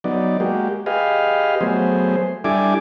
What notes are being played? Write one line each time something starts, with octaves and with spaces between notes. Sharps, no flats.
F#3 B3 D#4 D5
G#3 A#3 F#4 G4
G4 G#4 B4 D#5 F5
F#3 A3 B3 G#4 C5
G3 D4 E4 A4 G#5 D6